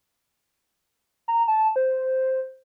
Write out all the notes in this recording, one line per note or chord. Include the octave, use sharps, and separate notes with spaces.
A#5
A5
C5